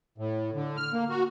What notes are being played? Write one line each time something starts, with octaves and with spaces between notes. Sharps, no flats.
A2
D3
F6
A#3
F#4